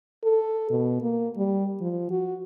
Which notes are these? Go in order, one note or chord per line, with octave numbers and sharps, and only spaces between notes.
A4
B2
A#3
G3
F3
F#4